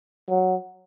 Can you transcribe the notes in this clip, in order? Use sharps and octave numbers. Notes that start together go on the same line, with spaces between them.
F#3